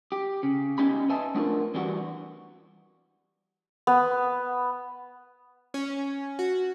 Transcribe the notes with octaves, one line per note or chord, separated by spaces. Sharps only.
G4
C#3
B3 C#4 D#4 G4 G#5 B5
B4 D#5 E5 G#5 A5
A3 B3 D4 F4 G4 A#4
E2 E3 G3 B3 F#4 F#5
B3
C#4
F#4